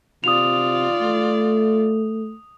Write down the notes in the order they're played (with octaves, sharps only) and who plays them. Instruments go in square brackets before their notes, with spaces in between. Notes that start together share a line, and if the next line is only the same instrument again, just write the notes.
[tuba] C3 [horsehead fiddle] F4 D5 [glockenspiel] D#6 F7
[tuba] A3